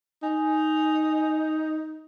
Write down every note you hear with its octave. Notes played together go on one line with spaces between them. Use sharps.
D#4 G#5